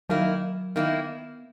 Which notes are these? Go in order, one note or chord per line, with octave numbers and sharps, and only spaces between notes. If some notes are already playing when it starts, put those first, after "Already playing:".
D#3 F#3 A#3 E4
D#3 A#3 B3 E4